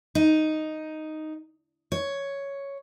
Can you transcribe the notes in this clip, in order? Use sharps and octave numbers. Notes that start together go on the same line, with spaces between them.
D#4
C#5